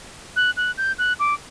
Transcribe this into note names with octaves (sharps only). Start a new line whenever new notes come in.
F#6
F#6
G6
F#6
D6